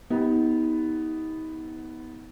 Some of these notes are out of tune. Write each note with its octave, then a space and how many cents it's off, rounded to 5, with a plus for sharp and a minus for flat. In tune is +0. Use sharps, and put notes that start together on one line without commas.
B3 +5 D#4 +35 G4 +0